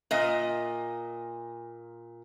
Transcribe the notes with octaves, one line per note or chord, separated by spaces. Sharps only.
A#2 D#5